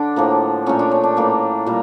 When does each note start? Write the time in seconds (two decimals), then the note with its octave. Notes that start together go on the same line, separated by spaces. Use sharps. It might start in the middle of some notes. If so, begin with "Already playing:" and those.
Already playing: D3 D4
0.16 A2 F3 A#3
0.66 A#2 A3 C#4
0.79 D4
0.91 C#4
1.04 D4
1.17 A2 E3 A#3
1.66 A#2 G3 A#3